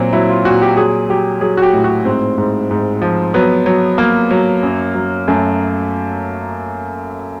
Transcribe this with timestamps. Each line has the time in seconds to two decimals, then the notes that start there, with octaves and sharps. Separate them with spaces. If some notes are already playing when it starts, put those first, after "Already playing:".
Already playing: A#2 F#3 C4
0.13 F#3 E4
0.30 F4
0.45 A#2 F#4
0.62 G4
0.77 F#3 G#4
1.09 F#3 G4
1.41 F#3 G#4
1.57 F#4
1.62 G4
1.73 A2
1.84 F#4
2.05 G#2 C4
2.38 G#2
2.71 G#2
3.02 F3
3.34 F#3 B3
3.66 F#3
3.98 F#3 A#3
4.31 F#3
4.63 F#2
4.95 F#3
5.28 F#2 A3